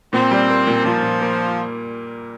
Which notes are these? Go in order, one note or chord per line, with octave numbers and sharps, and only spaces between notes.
A#2 C4
G3
A#3
A#2
A#2 F3
A#2
A#3